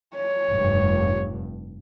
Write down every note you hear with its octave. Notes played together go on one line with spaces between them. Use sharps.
C#5
F1 G2